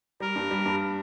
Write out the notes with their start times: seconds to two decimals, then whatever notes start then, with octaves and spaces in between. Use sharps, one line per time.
0.20 G3 A#4
0.36 G2
0.51 G3
0.66 G2